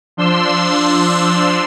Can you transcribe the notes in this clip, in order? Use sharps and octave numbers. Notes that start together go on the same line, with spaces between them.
F3 D4 C6 E6